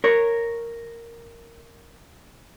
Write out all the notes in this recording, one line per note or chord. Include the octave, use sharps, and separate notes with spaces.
A#4 C#5